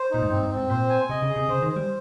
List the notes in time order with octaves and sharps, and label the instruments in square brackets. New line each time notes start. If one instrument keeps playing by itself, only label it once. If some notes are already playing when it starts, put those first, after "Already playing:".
Already playing: [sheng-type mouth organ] C5
[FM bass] A#2 [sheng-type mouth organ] D#4
[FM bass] G#2
[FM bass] G2 [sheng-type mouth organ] C4
[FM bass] G2
[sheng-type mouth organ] C4
[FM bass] G#2
[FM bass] A#2 [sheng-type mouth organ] C5
[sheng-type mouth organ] G#5
[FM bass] C3 [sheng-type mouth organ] D#5
[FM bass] C#3
[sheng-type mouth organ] G#4
[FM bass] C3
[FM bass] C#3 [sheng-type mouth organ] C5
[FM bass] D#3
[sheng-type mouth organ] C5
[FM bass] G3